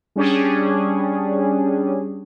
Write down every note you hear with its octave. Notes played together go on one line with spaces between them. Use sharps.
G3 C#4 D4 G#4